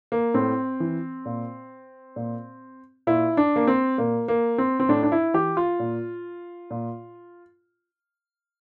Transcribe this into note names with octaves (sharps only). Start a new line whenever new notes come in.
A#3
A2 C4
E3
A#2
A#2
A#2 E4
D4
A#3
C4
A#2 A#3
A#3
C4
C4
A2 D4
D4
E4
E3 G4
F4
A#2
A#2